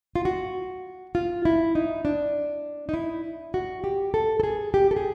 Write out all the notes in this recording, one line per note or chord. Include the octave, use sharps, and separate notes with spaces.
F4
F#4
F4
E4
D#4
D4
D#4
E4
F#4
G4
A4
A4
G#4
G4
A4
G#4